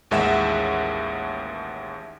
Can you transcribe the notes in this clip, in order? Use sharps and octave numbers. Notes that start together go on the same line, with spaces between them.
A1 D#2 G#3 E5 F#5 E7